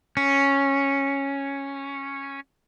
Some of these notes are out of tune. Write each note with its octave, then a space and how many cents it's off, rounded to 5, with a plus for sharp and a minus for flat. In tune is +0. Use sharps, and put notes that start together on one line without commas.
C#4 -5